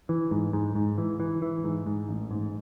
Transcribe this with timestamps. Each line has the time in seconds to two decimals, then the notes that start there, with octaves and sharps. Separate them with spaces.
0.09 E3
0.31 G#2
0.53 G#2
0.75 G#2
0.98 E3
1.20 E3
1.42 E3
1.64 G#2
1.86 G#2
2.09 A1
2.31 G#2